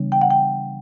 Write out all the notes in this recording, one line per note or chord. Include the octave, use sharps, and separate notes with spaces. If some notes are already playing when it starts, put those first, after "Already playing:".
Already playing: C#3 E3 G3 B3 D4
G5
F#5
G5